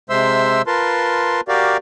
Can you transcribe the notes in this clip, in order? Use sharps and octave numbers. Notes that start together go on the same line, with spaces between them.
C3 G#3 C5 E5 C6 E6
F4 A#4 B4 A5 C6
F#4 G4 A#4 D5 F5